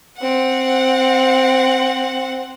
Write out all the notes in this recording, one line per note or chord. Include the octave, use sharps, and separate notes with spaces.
C4 F#5